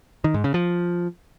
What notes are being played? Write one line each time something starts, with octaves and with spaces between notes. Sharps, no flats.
D#3
G#2
C#3
F3